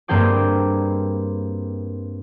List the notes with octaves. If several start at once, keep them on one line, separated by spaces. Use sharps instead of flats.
G2 A#3 C4 G#4 G5 D6